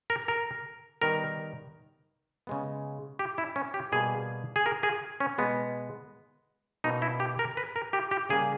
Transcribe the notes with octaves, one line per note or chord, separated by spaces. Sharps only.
A#4
A#4
D#3 G3 B3 A#4
C#3 G#3 B3
G4
E4
C#4
G4
B2 G3 A#3 G#4
G#4
A#4
G#4
C#4
B2 G#3 B3
B2 A#3 D#4
E4
G4
A#4
B4
A#4
G4
G4
C#3 G3 A#3 G#4